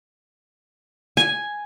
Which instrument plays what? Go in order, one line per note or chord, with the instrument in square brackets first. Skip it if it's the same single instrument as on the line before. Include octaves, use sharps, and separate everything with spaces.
[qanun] G#5